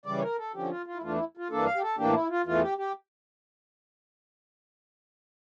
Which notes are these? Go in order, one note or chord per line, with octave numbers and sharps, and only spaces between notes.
C#3 E3 G3 D5
C#5
A#4
A4
D3 F3 C#4 G4
F4
F4
E4
E2 E3 A3 D4 F4
E4
F4
G2 E3 A#3 D4 A4
F5
G4
A4
A2 E3 A#3 D4 G4
E4
F4
E2 E3 A3 F4
G4
G4